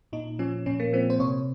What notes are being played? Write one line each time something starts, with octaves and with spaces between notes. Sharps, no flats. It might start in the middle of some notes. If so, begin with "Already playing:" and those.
A#2 D#4
F3 C#4
A#2 C#4
A#3
F3 C4
C5
C3 C#5